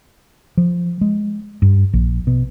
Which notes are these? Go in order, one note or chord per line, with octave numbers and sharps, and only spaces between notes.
F3
G#3
G2
A#1
B2